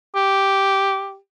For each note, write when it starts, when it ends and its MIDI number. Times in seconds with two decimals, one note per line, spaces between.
0.16 1.16 67